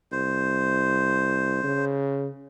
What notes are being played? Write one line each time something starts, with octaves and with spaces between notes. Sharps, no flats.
C2 C5
C#3